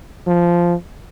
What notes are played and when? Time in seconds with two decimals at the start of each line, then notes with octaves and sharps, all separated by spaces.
0.27 F3